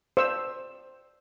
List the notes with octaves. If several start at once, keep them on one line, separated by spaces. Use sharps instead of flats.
C5 D5 E6